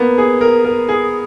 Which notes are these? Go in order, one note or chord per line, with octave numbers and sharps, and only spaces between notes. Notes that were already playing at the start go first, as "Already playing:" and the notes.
Already playing: A#3 B3
G#4
A#4
A#4
G#4